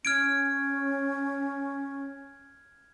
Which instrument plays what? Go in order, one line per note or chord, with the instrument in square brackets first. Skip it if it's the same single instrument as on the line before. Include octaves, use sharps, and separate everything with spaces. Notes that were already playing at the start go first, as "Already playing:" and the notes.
[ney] C#4 [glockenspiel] F6 G#6 D7